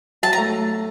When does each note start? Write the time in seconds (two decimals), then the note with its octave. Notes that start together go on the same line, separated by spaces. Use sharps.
0.23 F#3 A5
0.33 A#5
0.38 A3